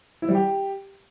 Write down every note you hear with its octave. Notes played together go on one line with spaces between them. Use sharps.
E4
G3
G4